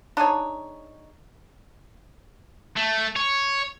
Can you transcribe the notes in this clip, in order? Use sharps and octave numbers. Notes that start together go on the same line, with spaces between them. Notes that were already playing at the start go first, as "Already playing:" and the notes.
D4 D#4 G#4 C#5
A3
C#5